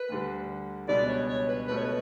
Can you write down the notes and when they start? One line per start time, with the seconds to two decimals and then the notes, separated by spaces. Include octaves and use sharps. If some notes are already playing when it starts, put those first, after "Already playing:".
Already playing: B4
0.09 D2 D3 G3
0.88 C#2 B2 G3 B3 D4 D5
1.09 C#5
1.28 C#5
1.48 B4
1.68 C#2 B2 A3 B4
1.77 C#5
1.85 B4